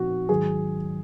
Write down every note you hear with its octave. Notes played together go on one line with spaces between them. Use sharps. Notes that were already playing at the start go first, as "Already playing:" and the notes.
Already playing: A#2 F3 C4 D#4 F#4
G#2 D#3 F#3 G#4